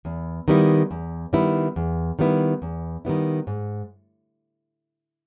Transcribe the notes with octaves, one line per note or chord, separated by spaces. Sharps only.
E2
D#3 G3 B3 E4
E2
D#3 G3 B3 E4
E2
D#3 G3 B3 E4
E2
D#3 G3 B3 E4
G#2